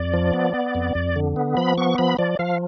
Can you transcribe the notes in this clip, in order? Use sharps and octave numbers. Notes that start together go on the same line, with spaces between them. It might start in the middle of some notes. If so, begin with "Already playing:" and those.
Already playing: F2 D5
F3
B3
B3
F2
F2
D3
B3
F3 B5
B3 C#6
F3 B5
F3 D5
F3 F5